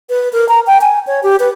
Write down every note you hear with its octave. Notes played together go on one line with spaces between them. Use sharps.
B4
A#4
A#5
G5
G#5
C#5
G4
B4